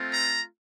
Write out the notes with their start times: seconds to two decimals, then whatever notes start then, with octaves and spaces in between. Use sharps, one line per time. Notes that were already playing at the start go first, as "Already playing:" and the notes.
Already playing: A3 C4 F4
0.13 A#5